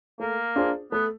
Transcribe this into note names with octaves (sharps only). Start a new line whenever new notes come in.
A3 A#3
D4 F4 G#4 C5
A3 B3